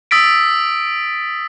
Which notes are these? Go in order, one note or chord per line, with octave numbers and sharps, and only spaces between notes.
D#6 E6 A6 B6 D7